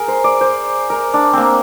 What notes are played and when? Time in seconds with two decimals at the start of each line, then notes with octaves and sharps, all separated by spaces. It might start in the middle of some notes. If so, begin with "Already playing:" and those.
Already playing: G#4 A#4
0.08 C5
0.24 D5
0.41 C5
0.90 A#4
1.14 D4
1.33 A#3 C4